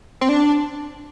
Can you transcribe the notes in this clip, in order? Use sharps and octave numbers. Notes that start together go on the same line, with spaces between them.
C4
D4